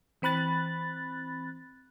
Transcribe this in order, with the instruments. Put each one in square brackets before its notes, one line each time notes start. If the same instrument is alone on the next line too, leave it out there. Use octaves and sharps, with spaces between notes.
[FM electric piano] E3 C4 B5 F#6 A6